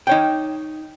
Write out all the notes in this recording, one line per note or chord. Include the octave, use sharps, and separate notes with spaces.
D#4 C#5 G5